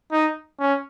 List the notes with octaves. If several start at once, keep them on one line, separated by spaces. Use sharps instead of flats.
D#4
C#4